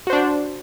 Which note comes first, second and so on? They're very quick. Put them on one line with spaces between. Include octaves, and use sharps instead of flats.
F#4 C5 D4